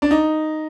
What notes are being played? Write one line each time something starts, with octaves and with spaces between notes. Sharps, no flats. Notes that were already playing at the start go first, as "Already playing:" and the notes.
D4
D#4